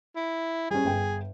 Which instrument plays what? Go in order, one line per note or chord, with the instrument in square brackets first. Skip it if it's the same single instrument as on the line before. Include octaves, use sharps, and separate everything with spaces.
[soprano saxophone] E4
[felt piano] G3 C#4 [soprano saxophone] G#4
[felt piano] G1 G5